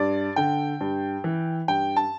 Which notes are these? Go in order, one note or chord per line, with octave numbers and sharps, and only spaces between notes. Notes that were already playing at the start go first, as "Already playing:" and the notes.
Already playing: G2 D5
D3 G5
G2
E3
G2 G5
A5